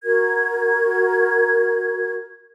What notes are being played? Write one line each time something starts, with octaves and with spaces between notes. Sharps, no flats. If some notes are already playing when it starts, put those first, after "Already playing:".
F#4 A#4 G#6